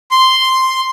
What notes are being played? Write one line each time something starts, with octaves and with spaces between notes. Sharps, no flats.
C6